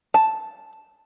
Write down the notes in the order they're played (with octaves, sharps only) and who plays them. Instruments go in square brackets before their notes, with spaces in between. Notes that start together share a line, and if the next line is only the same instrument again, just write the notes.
[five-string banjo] A5